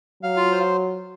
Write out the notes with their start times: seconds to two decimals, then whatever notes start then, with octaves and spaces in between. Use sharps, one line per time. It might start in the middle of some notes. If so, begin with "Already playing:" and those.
0.22 F#3 F5
0.37 F4
0.52 C5